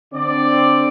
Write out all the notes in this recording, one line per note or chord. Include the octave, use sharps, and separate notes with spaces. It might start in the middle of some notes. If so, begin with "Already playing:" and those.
D3 C4 D5